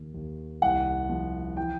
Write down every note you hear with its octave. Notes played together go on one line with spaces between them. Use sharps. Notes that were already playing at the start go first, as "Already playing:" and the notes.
Already playing: D#2
D#2
C2 F#5
F3
E3 G5